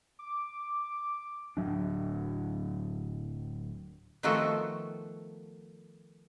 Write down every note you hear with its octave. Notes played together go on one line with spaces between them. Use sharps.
D6
D1 D#2 F#3 D4
D#3 F3 A3 B3 F#4 A4